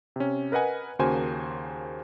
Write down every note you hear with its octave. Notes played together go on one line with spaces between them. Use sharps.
C3 C#4
A#4 B4 D#5 F#5 G#5
D#2 C#3 A#3 F#4 C5 G#5